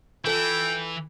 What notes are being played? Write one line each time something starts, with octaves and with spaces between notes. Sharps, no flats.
E3 F4 A4 G5